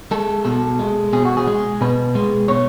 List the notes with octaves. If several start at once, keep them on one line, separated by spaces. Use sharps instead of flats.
G#3 A4
B2 A4
G#3
B2 G#4
F#4
G#4
G#3
B2 B4
G#3
B2 C#5